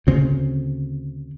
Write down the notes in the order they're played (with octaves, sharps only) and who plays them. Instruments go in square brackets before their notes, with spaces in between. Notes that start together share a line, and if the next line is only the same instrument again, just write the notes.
[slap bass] D2 C#3 C4